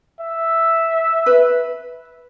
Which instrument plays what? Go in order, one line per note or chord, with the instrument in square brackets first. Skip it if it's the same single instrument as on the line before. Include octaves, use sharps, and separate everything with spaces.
[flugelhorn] E5
[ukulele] B4